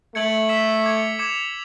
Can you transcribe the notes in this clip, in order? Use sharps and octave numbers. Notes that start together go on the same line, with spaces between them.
A3 G#6 C#7 F#7
E6 B6 E7
D6 G#6 C#7
D6 G#6 C#7 E7